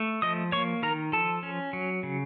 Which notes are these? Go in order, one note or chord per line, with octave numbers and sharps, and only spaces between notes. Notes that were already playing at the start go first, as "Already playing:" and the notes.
Already playing: A3
F3 D#5 D#6
A#3 C#5 C#6
D#3 A#4 A#5
F3 A4 A5
C#4
F#3
C#3